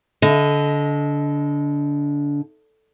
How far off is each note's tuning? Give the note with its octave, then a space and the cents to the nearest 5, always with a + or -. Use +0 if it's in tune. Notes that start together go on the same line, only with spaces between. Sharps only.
D3 -25 D#5 +0